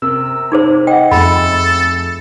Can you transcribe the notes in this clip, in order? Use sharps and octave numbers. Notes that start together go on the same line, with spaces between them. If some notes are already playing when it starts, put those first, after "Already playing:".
C3 A#4 E6
D#4 G#4 C5
D#5 F#5 G5
F2 A3 G#4 A4 B5 A6